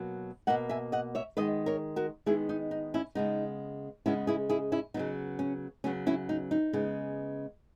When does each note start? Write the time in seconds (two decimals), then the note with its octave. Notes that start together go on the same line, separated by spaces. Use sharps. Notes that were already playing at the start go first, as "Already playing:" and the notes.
Already playing: B2 F#3 A#3
0.47 B2 F#3 A#3 D#5 F#5
0.69 E5 G#5
0.92 D#5 F#5
1.15 C#5 E5
1.37 D#3 G#3 B3 B4 D#5
1.66 A#4 C#5
1.96 F#4 A#4
2.26 D#3 G#3 B3 E4 G#4
2.49 D#4
2.71 D#4
2.94 C#4 E4
3.15 C#3 G#3 B3 D#4
4.06 C#3 G#3 B3 C#4 E4
4.27 E4 G#4
4.49 E4 G#4
4.72 C#4 E4
4.94 C#3 F#3 B3 D#4
5.39 C#4
5.84 C#3 F#3 B3 C#4
6.07 C#4 E4
6.29 D#4
6.51 D#4
6.73 C#3 G#3 B3